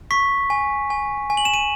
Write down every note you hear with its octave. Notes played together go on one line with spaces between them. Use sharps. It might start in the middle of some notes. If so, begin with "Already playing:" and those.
C#6 B6
G#5
G#5
G#5
F#7
E7
D#7